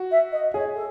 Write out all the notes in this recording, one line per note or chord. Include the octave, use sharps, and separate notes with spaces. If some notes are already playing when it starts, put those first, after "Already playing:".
Already playing: F#4
E5
D#5
G#4 C#5
A4